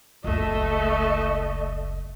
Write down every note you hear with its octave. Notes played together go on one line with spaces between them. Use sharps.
F#1 C#2 A3 D#5